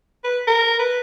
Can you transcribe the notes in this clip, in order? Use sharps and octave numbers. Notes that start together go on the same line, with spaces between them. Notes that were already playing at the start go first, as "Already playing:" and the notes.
B4
A#4
B4